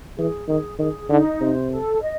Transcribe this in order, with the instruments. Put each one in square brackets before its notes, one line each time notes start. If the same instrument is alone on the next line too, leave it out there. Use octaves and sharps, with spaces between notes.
[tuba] E3 [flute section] G#4
[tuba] D#3 [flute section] G#4
[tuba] D#3 [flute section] G#4
[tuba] D3 [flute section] D#4
[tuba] C3 [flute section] C5
[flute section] A4
D#5